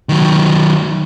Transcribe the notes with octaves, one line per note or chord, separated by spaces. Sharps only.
D#3 F#3